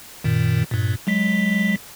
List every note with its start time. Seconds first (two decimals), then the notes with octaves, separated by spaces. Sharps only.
0.24 F#2 A#2 D#3
0.71 G2 A#2
1.07 F#3 G#3 B6